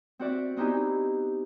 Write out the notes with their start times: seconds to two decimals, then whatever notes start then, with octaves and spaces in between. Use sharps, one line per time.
0.19 C4 F#4 D5 E5
0.57 B3 C4 D#4 E4 G4 G#5